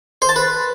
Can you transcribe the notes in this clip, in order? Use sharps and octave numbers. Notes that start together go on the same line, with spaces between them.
C5
A5
B4